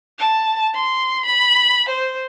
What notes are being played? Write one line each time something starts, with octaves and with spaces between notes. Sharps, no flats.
A5
C6
B5
C5